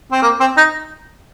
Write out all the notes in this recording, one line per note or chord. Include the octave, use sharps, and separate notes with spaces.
C4
A#3
C4
D#4